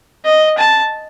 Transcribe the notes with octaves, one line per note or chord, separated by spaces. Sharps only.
D#5
A5